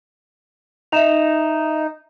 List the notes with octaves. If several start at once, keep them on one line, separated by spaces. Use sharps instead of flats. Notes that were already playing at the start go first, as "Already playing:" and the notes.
D#4 E5 E7 F7